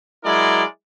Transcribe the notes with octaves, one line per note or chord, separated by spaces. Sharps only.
F#3 G#3 E4 A#4 D5